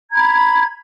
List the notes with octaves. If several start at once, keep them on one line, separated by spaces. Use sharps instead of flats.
A#5 B5 G#6